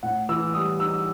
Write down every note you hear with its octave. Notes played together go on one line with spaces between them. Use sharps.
A2 F#5
E3 E6
G3 D#6
D#4 E6